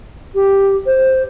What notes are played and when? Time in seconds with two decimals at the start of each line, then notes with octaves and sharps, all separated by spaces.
0.35 G4
0.86 C5